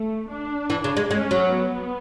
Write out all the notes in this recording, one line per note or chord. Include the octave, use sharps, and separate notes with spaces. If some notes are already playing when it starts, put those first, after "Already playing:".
Already playing: A3
D4
E3
C#3
G#3
G#3 C#4
F#3
B3